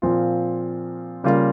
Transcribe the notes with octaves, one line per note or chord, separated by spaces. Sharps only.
A#2 F3 C4 F4
C#3 G3 A#3 F4